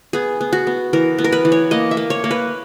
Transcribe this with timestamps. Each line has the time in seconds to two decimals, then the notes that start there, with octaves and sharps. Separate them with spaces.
0.13 B3 G#4
0.41 B3
0.53 F#4
0.67 B3
0.93 E3 A#4
1.18 B3
1.24 A#4
1.32 B4
1.45 E3
1.52 C#5
1.71 A#3 D#5
1.91 E5
1.97 A#3
2.10 C#5
2.24 A#3
2.31 B4